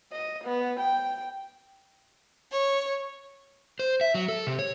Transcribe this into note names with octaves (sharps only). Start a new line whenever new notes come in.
D#5
B3
G5
C#5
C5
E5
F#3
A4
C3
C#5